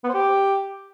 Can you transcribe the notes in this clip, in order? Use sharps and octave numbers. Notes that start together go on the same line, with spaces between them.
B3
C5
G4